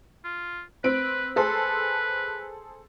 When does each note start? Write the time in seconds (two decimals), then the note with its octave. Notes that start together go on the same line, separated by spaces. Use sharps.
0.24 F4
0.84 C4 B4 D7
1.36 G#4 A4 B4 C5